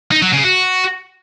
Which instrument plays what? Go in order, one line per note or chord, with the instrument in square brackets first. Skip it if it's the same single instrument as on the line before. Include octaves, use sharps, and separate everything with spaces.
[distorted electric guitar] D#4
F#3
C#3
F#4